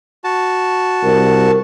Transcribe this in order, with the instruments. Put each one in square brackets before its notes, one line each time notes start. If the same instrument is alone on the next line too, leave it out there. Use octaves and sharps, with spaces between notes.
[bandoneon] F#4 A5
[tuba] C2 [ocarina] A#4